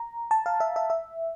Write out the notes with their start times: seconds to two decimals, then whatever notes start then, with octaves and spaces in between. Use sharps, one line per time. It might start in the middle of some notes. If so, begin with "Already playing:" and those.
Already playing: A#5
0.31 A5
0.46 F5
0.60 E5
0.76 E5
0.90 E5